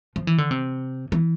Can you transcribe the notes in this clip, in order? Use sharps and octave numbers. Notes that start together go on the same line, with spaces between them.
F3
E3
D3
C3
E3